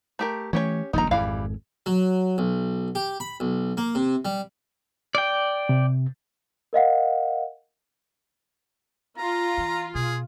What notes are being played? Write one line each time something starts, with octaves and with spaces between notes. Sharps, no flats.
A3 G4 A#4
E3 A3 C#4 G4 C#5
D#1 A#1 G#2 D#4 A#5
G#1 F2 E3 G3 F5
F#3
B1
G4
B5
B1
A#3
C3
G3
D5 G5
C3
A#4 D#5 F5 F#5
F4 A#5
E3
B2 G#4